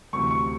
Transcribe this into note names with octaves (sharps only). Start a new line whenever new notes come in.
D2 C3 E3 C#6
C#6